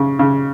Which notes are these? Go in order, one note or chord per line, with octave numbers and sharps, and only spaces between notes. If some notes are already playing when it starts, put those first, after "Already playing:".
Already playing: C#3
C#3